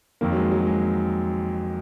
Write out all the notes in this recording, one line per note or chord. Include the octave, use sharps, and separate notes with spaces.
F2 D#3 A#3
F#3
G#3
F#3
G#3